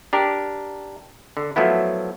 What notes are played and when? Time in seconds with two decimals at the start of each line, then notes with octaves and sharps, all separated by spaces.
0.13 D4 G4 A#4
1.37 D3
1.56 F3 F#3 A3 B3 E4